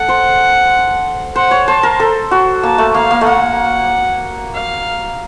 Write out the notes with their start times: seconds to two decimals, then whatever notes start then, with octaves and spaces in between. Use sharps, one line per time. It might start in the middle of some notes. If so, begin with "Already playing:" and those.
Already playing: A4 F#5
0.09 C5
1.36 C5 F#5
1.51 C#5
1.68 C5 A5
1.83 A#4
2.00 A4
2.31 F#4
2.63 A#3 A5
2.78 A3
2.94 A#3 F5
3.11 A#3
3.21 A3
3.26 A#3 F#5
4.54 F5